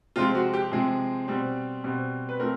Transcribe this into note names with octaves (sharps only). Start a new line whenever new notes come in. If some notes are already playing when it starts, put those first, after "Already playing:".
C3 F3 G#3 C4 F4
F#4
G4
C3 F3 G#3 C4 G#4
B2 G3 C4
B2 G3 C4
B4
F3 A3 C4 A#4